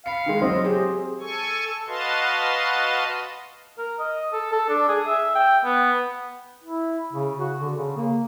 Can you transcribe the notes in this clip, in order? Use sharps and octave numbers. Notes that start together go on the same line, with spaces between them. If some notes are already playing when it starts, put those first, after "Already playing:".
F5 B5 B6 C#7
D#3 G#3
F#3 C4 C5 D#5
G4 G#4
A4 G#5 C#6
F#4 B4 D#5 F5 A5 C6
A#4
D#5
A4
A4
D4
G#4
E5
G5
B3
E4
C#3
F#4
D3
C#3
A#3